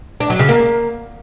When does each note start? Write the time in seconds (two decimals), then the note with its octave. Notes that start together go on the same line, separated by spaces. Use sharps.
0.20 D4
0.30 F#3
0.39 C#3
0.49 A#3